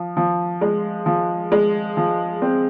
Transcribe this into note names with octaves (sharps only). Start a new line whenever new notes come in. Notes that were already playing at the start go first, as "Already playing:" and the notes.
Already playing: F3
F3
G#3
F3
G#3
F3
C4